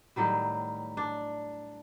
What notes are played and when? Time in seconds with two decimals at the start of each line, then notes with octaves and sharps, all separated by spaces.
0.16 A2 D#3 F#3 G3
0.97 D4